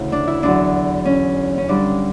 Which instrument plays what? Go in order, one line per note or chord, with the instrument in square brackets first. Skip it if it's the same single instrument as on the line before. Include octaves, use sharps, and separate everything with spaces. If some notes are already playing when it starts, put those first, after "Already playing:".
Already playing: [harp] D2 C#3 E3 E4
D4
E4
E2 D3 F#3 D4
C#4
C#4
G2 D3 G3 D4